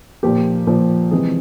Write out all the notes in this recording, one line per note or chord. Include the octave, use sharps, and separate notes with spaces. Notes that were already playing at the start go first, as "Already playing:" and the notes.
A#2 F3 A#3 G4
A#2 F3 A#3
C3 E3 G#3 C4 G#4